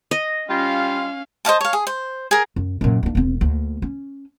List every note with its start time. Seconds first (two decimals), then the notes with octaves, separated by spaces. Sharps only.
0.11 D#5
0.49 G3 C#4 F4 F5
1.45 C5 D#5 F5 A5
1.61 C#5 F5
1.73 G#4
1.87 C5
2.31 G#4 A#4
2.56 F#2
2.81 F#2 A#2
3.03 A#3 D4
3.15 E1 C4
3.41 D2 A#3
3.82 C#4